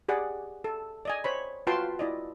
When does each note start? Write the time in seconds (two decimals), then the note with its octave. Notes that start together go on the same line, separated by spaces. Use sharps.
0.08 G4 G#4 D5 F#5
0.64 A4
1.05 D5 D#5 G#5
1.24 C5 C#5 B5
1.67 F4 F#4 B4 G5 A5 C6
1.99 E4 D5 D#5